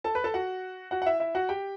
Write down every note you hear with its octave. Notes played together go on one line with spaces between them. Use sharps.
A4 A5
B4 B5
A4 A5
F#4 F#5
F#4 F#5
F#5
E4 E5
E4 E5
F#4 F#5
G4 G5